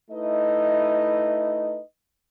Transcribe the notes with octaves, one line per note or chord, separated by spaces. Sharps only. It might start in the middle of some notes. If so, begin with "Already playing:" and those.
A3 D#4 E4 B4 D#5